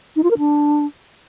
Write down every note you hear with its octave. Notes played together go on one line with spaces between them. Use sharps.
D#4
F4
A#4
D4